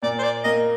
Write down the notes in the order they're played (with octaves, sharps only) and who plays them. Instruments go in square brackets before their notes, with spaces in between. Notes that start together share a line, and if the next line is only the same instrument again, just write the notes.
[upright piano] A#2 [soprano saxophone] D5
[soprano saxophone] C5
D5
[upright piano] A#3 [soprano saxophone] D#5